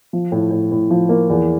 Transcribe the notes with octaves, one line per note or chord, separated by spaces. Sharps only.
F3
A2
A2
A2
F3
A#3
E2